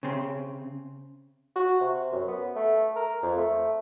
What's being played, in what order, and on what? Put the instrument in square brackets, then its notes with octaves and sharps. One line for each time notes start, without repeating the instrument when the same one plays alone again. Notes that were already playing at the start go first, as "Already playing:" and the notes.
[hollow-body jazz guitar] C#3 C4
[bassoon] F#4
C3
F#2
B3
A3
A#4
F2
A3